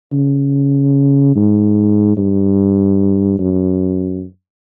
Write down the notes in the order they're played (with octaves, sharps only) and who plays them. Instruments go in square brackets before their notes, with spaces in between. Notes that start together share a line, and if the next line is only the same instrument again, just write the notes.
[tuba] C#3
G#2
G2
F#2